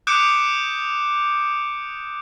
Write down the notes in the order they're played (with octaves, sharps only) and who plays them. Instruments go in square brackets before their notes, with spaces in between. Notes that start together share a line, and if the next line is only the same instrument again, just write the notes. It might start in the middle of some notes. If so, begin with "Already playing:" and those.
[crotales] D6 D#6 F#6 G6 C#7 D7